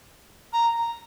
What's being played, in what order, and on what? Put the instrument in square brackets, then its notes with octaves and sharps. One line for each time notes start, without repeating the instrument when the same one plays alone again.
[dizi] A#5